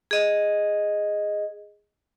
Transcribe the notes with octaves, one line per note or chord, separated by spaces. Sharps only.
G#4 D#5